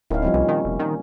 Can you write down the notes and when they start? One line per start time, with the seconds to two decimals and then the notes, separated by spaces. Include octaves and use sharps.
0.10 D1 D#3 C#4 E4 C#5 F5
0.22 F3 G3 C4
0.34 C2 A#2
0.48 D#3 C#4
0.65 F1
0.80 D#3